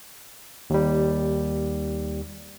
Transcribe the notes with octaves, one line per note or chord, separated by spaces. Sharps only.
D#2 G3